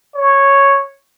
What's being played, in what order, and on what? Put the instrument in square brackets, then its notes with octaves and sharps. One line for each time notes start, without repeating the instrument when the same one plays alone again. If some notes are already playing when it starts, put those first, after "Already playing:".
[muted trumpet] C#5